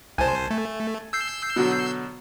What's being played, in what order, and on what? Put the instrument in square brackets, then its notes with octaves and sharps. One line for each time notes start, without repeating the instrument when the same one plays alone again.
[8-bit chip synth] C2 C5 [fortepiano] G#5 A5
[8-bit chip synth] A3
E6 G6 C7
[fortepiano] B2 D3 F#3